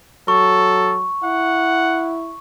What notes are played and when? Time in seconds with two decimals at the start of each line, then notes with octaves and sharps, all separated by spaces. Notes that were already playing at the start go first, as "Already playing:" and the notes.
0.28 F#3 A4 C#6
1.24 E4 F#5